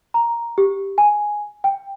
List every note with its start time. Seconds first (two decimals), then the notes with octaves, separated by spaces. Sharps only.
0.14 A#5
0.58 G4
0.98 G#5
1.64 G5